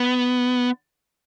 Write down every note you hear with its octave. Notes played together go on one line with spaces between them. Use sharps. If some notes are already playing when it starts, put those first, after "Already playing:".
Already playing: B3